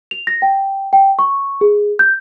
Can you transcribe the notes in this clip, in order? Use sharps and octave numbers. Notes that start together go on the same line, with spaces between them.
F7
A#6
G5
G5
C#6
G#4
G6